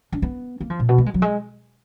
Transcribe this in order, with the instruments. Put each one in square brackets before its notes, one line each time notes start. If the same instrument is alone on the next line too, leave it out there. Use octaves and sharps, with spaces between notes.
[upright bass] D4
B3
A#3
F3
A#2
B2
A#3
G#3
F#3
G#3